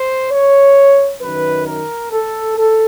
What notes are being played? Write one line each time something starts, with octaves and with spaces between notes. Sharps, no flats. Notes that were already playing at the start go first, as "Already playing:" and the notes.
Already playing: C5
C#5
F#2 D#3 B4
A#4
A4
A4